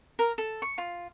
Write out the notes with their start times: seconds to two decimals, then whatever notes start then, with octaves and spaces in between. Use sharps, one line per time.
0.19 A#4
0.38 A4
0.62 C#6
0.78 F4